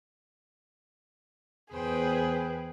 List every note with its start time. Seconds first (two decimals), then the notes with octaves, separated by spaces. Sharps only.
1.72 E2 G#4 B4 C5 G5